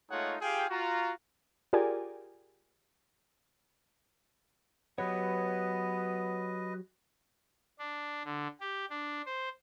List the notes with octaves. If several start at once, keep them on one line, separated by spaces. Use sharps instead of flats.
G#3 A3 D#4 F4 C#5 F#5
F4 G4 G#4 F5 G5
F4 F#4 A#5
F4 G4 G#4 A#4 D5 G#5
F#3 B3 G4 B4 C#5 D#5
D4
D3
G4
D4
C5